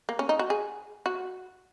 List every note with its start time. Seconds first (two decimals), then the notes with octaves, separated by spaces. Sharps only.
0.09 A#3
0.19 C#4
0.29 D#4
0.39 F#4
0.50 G#4
1.06 F#4